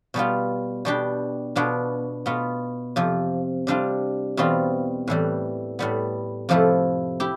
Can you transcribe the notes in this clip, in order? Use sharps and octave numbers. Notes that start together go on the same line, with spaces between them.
B2 G3 B3 F4
B2 G3 D4 G4
B2 B3 D4 F4
B2 B3 F4
F2 C3 F3
C3 G3 D4 F4
E2 B2 G3 C4 F4
A2 E3 G3
A2 G3 B3
F2 C3 F3 A3 E4
E4 G4